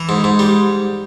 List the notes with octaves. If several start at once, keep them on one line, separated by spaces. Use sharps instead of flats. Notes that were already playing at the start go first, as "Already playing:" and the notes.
Already playing: E3
G#2
G#2
G3